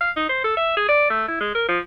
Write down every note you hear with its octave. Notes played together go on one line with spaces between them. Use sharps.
F5
D#4
C5
A4
E5
G#4
D5
A3
E4
G#3
A#4
F3